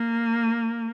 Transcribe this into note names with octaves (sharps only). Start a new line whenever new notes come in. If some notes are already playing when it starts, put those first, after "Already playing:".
Already playing: A#3